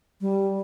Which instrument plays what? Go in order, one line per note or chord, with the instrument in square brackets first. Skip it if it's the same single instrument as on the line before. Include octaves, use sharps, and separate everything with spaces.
[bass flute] G3